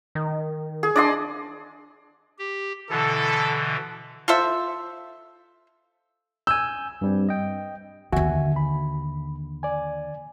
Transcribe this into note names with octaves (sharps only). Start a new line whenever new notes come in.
D#3
G#4
D4 D5 D#5 C6
G4
B2 D3 E3 E4 A4
F4 A4 C5 E5
G#5 E6 G6
G2 G3 C4
D#5 G5
D#2 D3 F#4 E5 G#5
B5
D5 G#5